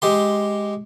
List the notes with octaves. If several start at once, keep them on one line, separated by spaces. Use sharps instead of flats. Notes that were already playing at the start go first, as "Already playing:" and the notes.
G#3 G4 C6